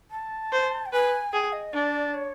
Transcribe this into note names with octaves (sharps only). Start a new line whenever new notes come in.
A5
C5
G5
B4 G#5
G#4 G5
D#5
D4 D5
C#5